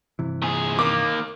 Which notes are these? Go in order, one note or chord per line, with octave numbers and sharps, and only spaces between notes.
G2 C3 E3
A#2 G#4
D#3 A#3 D6